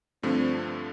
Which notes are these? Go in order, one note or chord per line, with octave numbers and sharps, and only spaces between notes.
G2 D3 F3 A3 C4